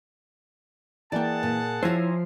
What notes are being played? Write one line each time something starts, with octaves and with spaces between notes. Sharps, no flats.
E3 A#3 G#4 D5 F#5 G5 A5
A#2
F3 E4 C5 C#5 E5 G#5 A#5